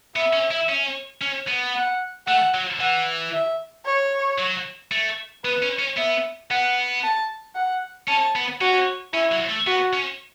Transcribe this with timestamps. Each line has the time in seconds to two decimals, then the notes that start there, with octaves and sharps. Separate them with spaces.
0.16 B3 E5
0.33 C#4
0.51 E4
0.69 C#4
1.21 C#4
1.48 B3
1.75 F#5
2.27 A3 F#5
2.54 F#3
2.80 E3 F#5
3.33 E5
3.86 C#5
4.38 F#3
4.92 A3
5.44 B3 B4
5.63 C#4
5.79 C#4
5.97 B3 E5
6.50 B3 F#5
7.03 A5
7.55 F#5
8.08 C#4 A5
8.35 B3
8.61 C#4 F#4
9.14 C#4 E4
9.32 F#3
9.49 A3
9.67 B3 F#4
9.93 C#4